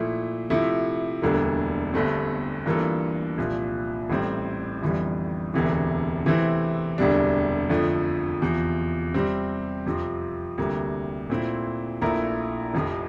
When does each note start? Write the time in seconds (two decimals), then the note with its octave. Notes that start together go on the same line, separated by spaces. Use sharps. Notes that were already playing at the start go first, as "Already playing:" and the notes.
Already playing: A#2 F3 A3 E4
0.50 C3 F3 A3 E4
1.22 E1 D2 D3 G3 A#3
1.94 G1 G2 D3 A3 C4
2.66 G2 E3 A#3 F4 A4
3.38 C2 A#2 F3
4.10 A1 A2 G3 C4
4.82 G1 F2 E3 G3
5.54 E1 D2 C3 E3
6.26 C3 E3 A3 C4 E4
6.98 E1 D2 C3 G3 D4
7.70 F2 D3 F3 A3
8.42 E2 C3 F3
9.14 C3 G3 C4
9.86 F2 C3 F3 C4
10.58 D2 C3 G3 A#3
11.30 A#2 A3 C4 E4
12.02 A#1 A#2 A3 E4 A#4
12.74 F1 F2 C3 F3